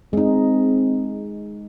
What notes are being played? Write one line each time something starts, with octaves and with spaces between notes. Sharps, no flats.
G#3 C4 D#4